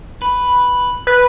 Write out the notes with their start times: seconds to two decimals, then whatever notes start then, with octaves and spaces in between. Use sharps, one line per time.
0.22 B4
1.07 B4